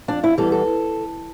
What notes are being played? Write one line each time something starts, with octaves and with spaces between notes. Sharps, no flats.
F2 D4
E4
E3 G3 B3 A4
A4